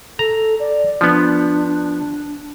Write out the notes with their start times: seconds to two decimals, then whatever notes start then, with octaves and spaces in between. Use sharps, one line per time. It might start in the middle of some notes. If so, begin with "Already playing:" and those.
0.19 A4 A#5
0.60 D5
1.01 F3 B3 D4